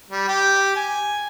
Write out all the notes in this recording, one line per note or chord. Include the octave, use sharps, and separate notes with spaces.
G3
G4
G#5